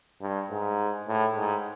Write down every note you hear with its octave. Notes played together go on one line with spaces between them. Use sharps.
G2
G#2
A2
G#2